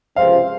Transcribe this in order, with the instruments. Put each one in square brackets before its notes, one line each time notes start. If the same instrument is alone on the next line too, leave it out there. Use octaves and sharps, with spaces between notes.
[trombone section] C#2 C3 F3 C4 [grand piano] F5